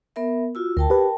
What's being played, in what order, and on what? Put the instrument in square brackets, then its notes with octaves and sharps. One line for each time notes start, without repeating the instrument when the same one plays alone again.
[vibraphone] B3 A#4 E5
F4 F#4 E6
[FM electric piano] D2 [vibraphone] A#4 G5 A5
[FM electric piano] G4 B4